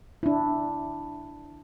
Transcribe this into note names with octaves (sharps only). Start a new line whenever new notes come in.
D4 E4